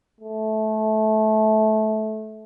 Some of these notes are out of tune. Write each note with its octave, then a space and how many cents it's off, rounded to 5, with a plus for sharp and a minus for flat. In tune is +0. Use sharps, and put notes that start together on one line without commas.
A3 -20